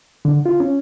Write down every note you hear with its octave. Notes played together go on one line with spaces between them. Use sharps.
D3
F4
C#4